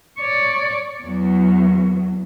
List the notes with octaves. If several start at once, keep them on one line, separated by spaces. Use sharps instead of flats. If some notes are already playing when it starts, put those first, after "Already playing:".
C#5 D5
E2 F#3